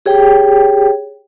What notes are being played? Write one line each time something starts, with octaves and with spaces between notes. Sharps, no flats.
G4 G#4 C#5 G5